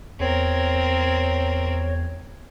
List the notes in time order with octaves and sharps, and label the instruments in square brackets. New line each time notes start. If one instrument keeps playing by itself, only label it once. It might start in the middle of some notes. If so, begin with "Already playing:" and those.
[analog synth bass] E2 [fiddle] C4 A#4 [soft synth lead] C#5